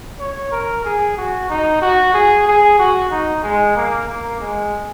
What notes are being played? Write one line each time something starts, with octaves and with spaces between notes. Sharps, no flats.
C#5
A#4
G#4
F#4
D#4
F#4
G#4
G#4
F#4
D#4
G#3
A#3
A#3
G#3